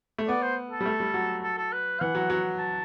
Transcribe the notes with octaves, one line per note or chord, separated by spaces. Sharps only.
A3
B3 D5
C5
A4
G3
A3
G3
F#3
A4
A4
B4
E3 F#5
F#3
F#3
A5